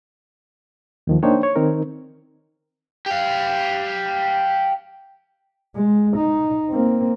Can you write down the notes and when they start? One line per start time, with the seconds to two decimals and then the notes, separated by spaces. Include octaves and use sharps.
1.07 D#2 D#3 F3
1.23 A#3 D4 D#4 C5 C#5 G5
1.43 C#5
1.56 D#3 C4 D#4 A#4
3.06 G4 F5
5.75 G#3
6.17 D#4
6.70 A#3 C4